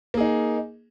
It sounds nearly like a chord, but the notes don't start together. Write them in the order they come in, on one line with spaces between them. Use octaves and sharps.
A#3 G#4 D#4